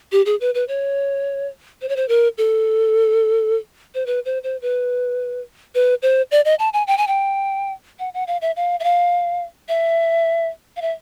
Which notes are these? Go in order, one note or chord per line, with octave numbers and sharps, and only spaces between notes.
G4
G#4
B4
B4
C#5
C5
C#5
C5
A#4
A4
C5
B4
C5
C5
B4
B4
C5
D5
D#5
A5
G#5
G5
G#5
G5
F#5
F#5
F5
E5
F5
E5
F5
E5
F5
E5